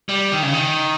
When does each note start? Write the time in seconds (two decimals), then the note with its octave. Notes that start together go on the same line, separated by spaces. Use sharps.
0.09 G3
0.32 D#3
0.43 C#3
0.53 D#3